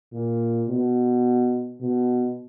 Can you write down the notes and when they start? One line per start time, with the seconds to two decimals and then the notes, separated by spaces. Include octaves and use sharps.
0.13 A#2
0.69 B2
1.81 B2